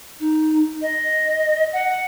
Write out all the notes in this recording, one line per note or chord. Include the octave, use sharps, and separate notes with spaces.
D#4
D#5
F#5